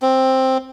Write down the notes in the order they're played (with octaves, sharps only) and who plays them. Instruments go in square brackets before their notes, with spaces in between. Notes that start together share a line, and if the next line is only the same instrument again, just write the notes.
[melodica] C4